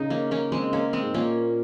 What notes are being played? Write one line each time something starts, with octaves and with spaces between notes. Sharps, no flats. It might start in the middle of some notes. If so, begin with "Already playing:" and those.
Already playing: C#3 D#4
A#3 C#4
C#3 A#3 C#4
G#3 C4
A#3 C#4
G#3 C4
G#2
A#2 A#3 C#4